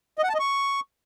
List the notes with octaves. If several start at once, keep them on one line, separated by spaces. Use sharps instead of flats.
D#5
F#5
A5
D#5
C#6